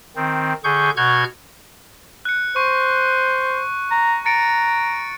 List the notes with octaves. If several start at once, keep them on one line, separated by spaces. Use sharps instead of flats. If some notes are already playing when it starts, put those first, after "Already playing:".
D#3 C4
D3 G#4 C#6 G6
B2 F#4 C#6 F6 G6 G#6
F#6 C#7
C5 C#6
A#5
A#5 A6 C#7 D7